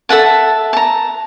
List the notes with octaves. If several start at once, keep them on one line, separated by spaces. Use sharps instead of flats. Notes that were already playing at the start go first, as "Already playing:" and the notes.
A4 E5 F#5 A5
A5 A#5